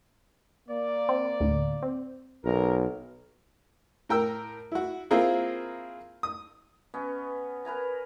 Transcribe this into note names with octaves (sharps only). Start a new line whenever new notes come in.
A#3 D5
C4
D2 A2
C4
B1 A#4
A2 A#4 G5 E6
E4 F#4
A#3 C4 E4 F4 G#4 A#4
D#6
B3 C#4 D#5
A#4 B4 G#5 A#5